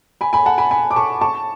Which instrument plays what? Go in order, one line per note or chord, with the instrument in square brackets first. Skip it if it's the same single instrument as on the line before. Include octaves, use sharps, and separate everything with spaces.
[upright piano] G#5 B5
G#5 B5
F#5 A5
G#5 B5
G#5 B5
D6
A5 C#6
A5 C#6